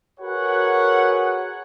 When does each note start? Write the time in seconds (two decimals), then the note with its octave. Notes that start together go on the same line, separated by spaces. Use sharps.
0.20 F#4 G#4 A#4 B4 C#5 F#5